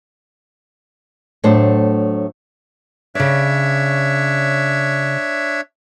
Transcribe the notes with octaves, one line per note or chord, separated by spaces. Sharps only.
A2 F#3 A3 D4 C5
C#3 D4 C#5 D5 E5